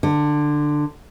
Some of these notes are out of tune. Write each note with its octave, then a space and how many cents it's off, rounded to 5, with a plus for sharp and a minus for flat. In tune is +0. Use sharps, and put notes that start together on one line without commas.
D3 +15